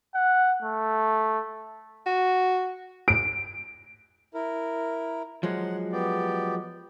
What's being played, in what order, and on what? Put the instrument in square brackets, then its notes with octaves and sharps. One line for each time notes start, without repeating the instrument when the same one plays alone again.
[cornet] F#5
A3
[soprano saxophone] F#4
[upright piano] D7
[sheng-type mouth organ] E4 A#4
[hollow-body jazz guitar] F3 F#3 G#3 [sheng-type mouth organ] F#5
[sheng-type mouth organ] B3 G4 D5